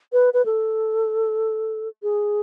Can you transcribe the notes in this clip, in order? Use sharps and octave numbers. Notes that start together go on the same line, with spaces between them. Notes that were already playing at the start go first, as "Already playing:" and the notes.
B4
B4
A4
G#4